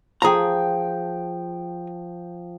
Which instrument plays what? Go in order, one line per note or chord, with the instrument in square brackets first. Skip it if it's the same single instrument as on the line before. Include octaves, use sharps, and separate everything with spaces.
[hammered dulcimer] F3 G5 [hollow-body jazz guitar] G#4 A#5